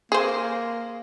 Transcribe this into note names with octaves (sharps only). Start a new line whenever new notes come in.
A#3 G#4 C5